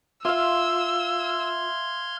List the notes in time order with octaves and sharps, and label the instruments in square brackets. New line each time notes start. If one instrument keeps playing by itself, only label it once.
[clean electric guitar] F4 [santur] E5 F5 [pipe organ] C6 F6 G#6 [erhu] E6